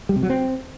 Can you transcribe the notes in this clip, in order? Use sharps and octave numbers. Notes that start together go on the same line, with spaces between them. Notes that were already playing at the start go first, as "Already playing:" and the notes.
G3
C3
F#3
C4